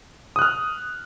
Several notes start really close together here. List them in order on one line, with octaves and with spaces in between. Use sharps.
D#6 F#6 F6